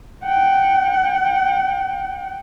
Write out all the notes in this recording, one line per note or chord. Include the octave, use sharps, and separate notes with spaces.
F#5 G5